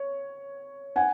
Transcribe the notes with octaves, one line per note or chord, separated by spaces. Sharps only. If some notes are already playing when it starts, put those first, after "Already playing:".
Already playing: C#5
F#5 G#5